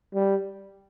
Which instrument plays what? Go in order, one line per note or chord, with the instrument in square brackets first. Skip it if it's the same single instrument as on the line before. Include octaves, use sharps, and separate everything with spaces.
[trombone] G3